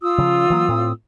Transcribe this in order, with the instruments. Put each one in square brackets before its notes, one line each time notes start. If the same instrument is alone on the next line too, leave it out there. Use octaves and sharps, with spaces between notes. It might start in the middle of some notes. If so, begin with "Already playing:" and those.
[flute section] F4 D#6 E6
[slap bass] C#3 F3
E3 F#3 A#3
A2 C4